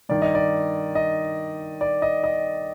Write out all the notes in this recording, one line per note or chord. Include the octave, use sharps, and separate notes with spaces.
G2 D#3 D5
D#5
D5
D#5
D5
D#5
D#5